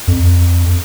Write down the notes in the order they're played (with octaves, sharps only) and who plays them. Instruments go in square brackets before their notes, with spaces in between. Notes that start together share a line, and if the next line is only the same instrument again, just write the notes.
[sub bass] F2